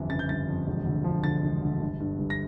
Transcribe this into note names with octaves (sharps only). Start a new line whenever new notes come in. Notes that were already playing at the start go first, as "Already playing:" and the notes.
Already playing: G1 F2 E3
C#3 A6
G6
G1 A6
F2
E1
D2
F3
D3 A6
E1
D2
G1
G2
G1
A#6